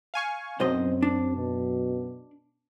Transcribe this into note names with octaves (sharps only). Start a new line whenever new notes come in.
F5 G#5 C#6
B1 F#2 F#3 C4 C5 D#5
D4
B2